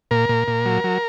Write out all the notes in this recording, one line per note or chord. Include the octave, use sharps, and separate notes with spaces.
A#2 A#4
A#2
A#2
F#3
F#3